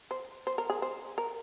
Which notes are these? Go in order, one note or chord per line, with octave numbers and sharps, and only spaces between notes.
C5
C5
A#4
G#4
C5
A#4